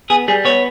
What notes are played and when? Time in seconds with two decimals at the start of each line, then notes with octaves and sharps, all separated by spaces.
0.10 B3 G#4
0.28 G3 G#4
0.45 B3 C#5